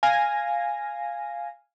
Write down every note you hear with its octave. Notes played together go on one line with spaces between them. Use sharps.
F5 G#5 A#6